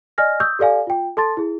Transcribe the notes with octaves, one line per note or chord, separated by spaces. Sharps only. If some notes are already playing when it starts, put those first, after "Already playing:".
D5 D#5 G#5 F6 A#6
C#6 D#6 E6 G6
G4 A4 D5 F5 G#5
F4 G5
A4 A5 C6 A6
E4 G#4